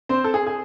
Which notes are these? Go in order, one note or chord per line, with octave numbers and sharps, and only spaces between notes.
C4 C5
A4
G#4
G#4